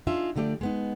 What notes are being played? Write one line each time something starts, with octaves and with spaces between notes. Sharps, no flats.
D4 D#4 F4 G#4 E5
D3 F3 A3 G4 D5
G#3 B3 D#4